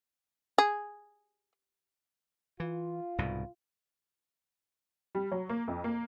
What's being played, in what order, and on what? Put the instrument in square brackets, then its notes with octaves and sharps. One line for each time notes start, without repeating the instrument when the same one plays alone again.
[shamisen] G#4
[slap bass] E3 [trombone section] F4
[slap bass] C2 G#2 B2
[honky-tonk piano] G3
F#3
A#3
F2
A#3